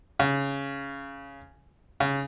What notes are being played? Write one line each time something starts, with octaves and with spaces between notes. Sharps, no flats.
C#3
C#3